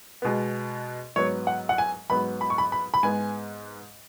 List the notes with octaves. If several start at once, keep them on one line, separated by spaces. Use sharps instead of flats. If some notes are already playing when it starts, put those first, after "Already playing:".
B2 G#3 B3
G#2 F#3 B3 C#5
F#5
F#5
G#5
G#2 F#3 B3 B5
B5
C#6
B5
B5
B5
G#2 G#3 B3 G#5